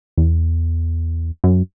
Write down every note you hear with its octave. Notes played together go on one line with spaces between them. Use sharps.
E2
F#2